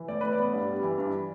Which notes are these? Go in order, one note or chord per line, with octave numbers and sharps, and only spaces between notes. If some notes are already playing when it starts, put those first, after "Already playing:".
Already playing: E3
A2 D5
A2 B4
D5
B3
G2
G3
E3
G2